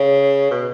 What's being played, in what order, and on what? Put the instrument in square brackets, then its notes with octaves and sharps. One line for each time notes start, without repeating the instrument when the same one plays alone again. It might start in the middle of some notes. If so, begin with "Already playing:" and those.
Already playing: [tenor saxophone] C#3
B2